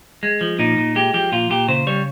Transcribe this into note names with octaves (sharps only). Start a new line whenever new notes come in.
G#3
F3
A#2 D#4
A#2
G#3 G4
F3 G4
A#2 F4
A#2 G4
C#3 C5
G3 C#5